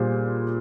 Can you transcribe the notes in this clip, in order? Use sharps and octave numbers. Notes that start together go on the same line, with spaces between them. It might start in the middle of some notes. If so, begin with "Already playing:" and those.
Already playing: A#2 G3 G#4 C5